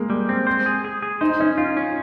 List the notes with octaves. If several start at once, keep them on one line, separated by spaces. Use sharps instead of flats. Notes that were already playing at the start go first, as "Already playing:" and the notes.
Already playing: G#3 A#3
G3
C4
C5
G#4
G#4
G#4
D#4 C5
C#4 D#4
F4
C#4